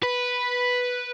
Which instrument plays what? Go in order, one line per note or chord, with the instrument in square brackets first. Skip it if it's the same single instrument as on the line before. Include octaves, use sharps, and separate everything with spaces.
[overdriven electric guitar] B4